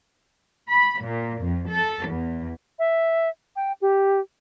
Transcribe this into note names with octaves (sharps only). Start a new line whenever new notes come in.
B5
A#2
F2
A4
E2
E5
G5
G4